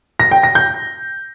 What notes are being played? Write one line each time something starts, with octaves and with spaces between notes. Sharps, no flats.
A#6
G5
A#6
G6